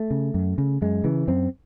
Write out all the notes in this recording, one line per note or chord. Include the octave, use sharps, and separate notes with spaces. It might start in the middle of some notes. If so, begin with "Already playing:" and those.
Already playing: A3
C#3
F#2
C#3
F#2 G#3
C#3 E3
F#2 C4